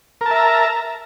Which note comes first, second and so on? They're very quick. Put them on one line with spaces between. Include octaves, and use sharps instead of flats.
A#4 A5 E5 A#5